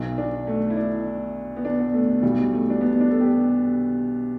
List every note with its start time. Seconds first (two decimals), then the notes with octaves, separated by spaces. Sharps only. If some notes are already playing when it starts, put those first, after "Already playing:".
Already playing: B1 B2
0.18 D4
0.47 A3
0.70 E4
0.77 D4
1.57 B3
1.65 D4
1.79 B3
1.93 A3
2.08 A3
2.22 B1 B2 G3
2.53 A3
2.70 D4
2.81 B3
3.01 D4
3.11 A4
3.21 G4